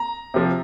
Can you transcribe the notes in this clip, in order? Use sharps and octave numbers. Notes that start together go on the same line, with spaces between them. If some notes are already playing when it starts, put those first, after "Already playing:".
Already playing: A#5
C3 F3